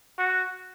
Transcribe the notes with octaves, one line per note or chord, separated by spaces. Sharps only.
F#4